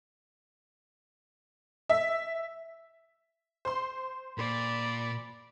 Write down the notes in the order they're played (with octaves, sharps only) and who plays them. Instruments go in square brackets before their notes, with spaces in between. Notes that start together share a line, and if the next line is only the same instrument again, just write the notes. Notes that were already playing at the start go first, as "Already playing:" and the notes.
[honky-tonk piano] E5
C5 C6
[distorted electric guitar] A#2 [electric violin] D5 B5